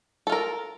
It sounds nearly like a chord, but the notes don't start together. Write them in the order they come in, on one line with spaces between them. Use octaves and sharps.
A4 F4 A#4